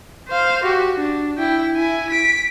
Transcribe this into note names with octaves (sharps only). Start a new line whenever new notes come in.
C5 F5
F#4 G4
D4
E4 G5
E4 G#5
B6 D7